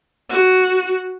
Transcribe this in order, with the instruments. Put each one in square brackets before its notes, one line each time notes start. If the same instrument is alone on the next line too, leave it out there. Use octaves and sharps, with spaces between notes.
[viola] F#4